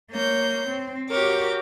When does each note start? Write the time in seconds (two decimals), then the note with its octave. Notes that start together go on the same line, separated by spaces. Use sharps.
0.11 A#3 C#5 G6
0.69 C4
1.10 F#4 G4 A#4 C#5 D6